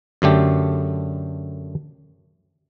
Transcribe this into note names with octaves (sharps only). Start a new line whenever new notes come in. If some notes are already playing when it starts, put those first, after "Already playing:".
F#2 D3 A3 G4